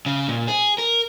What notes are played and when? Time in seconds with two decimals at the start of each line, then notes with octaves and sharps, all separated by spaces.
0.06 C#3
0.28 A#2
0.48 G#4
0.78 A#4